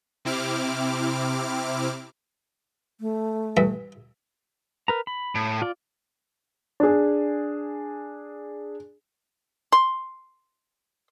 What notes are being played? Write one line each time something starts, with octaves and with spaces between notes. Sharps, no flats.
C3 C4 E4 D6 F6
A3
G2 E3 E5
A#4 B4 A#5
B5
A2
F4 D5
D4 G#4
C6